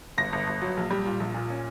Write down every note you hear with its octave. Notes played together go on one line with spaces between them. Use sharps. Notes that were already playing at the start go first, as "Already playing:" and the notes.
G1 A#6
G1
G1
F#3
A#1
G3
A#2
A#1
A#2
C#4